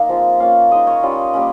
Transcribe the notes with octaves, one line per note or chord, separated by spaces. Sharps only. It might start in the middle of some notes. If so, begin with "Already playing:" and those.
Already playing: A#3 D#4 F5
F3 G#3 C4 F4
A#3 C#4 F4 F5
G#3 D#4 D#5
C#5
G3 C#4 F4
G3 A#3 C#4